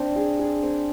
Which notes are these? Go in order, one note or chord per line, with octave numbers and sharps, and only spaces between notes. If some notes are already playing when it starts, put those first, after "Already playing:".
Already playing: C4 D4
G#4
G#4
C4